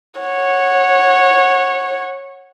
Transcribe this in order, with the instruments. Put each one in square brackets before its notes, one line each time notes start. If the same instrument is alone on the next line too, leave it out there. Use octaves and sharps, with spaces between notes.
[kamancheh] C#5 F#5